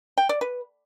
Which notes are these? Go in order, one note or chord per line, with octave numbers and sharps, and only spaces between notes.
G5
D5
B4